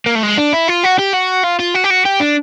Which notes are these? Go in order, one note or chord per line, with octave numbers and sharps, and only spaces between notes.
A#3
A3
G#3
D4
E4
F4
F#4
G4
F#4
F4
F4
F#4
G4
F#4
G4
D4